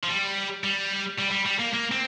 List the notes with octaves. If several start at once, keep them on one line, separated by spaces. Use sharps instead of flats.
F3
G3
G3
G3
G3
G3
A#3
A#3
C4